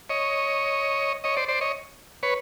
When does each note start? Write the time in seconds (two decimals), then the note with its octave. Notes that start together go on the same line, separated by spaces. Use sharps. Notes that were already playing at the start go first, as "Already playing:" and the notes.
0.10 C#5 D#5
1.24 C#5 D#5
1.36 C5 D5
1.48 C5 D5
1.61 C#5 D#5
2.23 B4 C#5